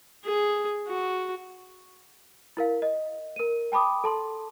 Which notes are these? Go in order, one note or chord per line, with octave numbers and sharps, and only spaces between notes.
G#4
F#4
E4 A#4 F5
D#5
A#4 D#7
G5 A5 B5 D6 D#6
A4 A5 C6